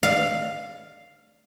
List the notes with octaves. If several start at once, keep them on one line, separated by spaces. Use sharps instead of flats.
F5